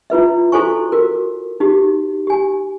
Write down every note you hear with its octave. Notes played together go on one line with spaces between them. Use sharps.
E4 F4 B4 E5
E4 F#4 A4 C5 G#5 C#6
F#4 A#4
D#4 F#4 G4
G4 G#5